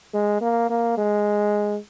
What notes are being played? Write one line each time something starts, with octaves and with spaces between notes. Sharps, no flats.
G#3
A#3
A#3
G#3